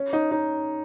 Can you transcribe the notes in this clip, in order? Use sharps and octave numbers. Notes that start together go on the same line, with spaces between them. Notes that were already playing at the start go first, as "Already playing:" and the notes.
Already playing: C#4
D#4
D#4